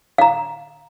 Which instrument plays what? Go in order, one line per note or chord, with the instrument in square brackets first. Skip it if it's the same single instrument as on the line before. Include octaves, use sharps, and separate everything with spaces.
[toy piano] F5 A#5